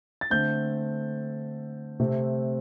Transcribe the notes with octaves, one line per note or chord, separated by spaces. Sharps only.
A6
D3 A3 C4 G6
C3 A3 C4